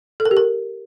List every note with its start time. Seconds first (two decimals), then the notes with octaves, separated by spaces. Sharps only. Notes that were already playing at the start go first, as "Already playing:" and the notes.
0.20 A4
0.25 A#4
0.31 G4
0.37 A#4